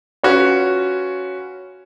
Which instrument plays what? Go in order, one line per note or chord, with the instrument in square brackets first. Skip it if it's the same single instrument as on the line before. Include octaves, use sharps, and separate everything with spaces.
[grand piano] C#4 F4 F#4 B4 C#5